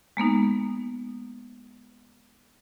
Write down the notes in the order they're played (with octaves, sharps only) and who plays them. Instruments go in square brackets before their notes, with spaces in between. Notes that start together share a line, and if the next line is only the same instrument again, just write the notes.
[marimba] G#3 A#3 B3 D#4